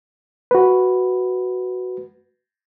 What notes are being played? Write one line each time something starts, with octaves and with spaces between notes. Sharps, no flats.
F#4 B4